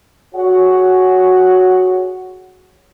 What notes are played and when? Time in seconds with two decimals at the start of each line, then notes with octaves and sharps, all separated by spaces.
0.35 F#4 G#4 C#5 F#5